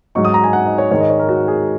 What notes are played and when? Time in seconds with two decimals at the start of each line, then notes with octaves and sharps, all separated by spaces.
0.15 G#2 F#3 D#4 C#6
0.25 D#6
0.34 A#5
0.44 G#5
0.53 F#5
0.66 D#5
0.78 C#5
0.91 G#2 D#3 G#3 C#5
1.01 D#5
1.10 C#5
1.19 A#4
1.29 F#4
1.48 G#4